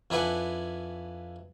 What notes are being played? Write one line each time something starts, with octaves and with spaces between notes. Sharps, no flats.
F2 D4 E4 B4 F#5 G#5